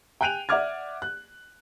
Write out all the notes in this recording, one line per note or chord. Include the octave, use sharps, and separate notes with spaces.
G5 G#5 F#6 D7 D#7 F7
D5 E5 F#5 D6 F6 G#6
F#6